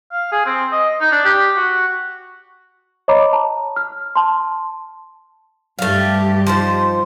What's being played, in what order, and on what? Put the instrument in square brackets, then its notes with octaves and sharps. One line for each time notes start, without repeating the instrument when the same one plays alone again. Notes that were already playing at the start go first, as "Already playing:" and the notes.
[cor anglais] F5
G#4
C4
D#5
D#4
D4
G4
F#4
[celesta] C#5 D#5 A#5 B5 D6
A5 A#5
F6
A5 C6
[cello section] G2 G4 [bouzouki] A3 F5
[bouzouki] F3 D#4 C5